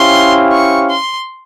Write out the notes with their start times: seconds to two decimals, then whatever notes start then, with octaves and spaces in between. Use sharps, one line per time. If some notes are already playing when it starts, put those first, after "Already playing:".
Already playing: C#4 E4 G4 C5 F5 C6
0.52 C#6
0.90 C6